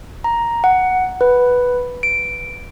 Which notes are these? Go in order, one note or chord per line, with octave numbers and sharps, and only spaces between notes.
A#5
F#5
B4
D7